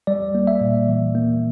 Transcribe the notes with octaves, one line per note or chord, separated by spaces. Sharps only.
G3 D5
A#3
E5
A#2
E3
A#3